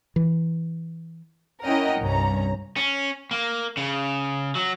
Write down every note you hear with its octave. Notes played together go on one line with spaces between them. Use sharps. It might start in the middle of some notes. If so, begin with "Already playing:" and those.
E3
C#4 E4 A#4 D#5 F#5 G5
C2 G2 C#4 A#5
C#4
A#3
C#3
F#3